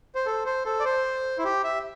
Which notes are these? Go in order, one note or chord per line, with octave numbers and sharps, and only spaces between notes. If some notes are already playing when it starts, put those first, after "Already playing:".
C5
A4
C5
A4
D5
C5
E4
G4
E5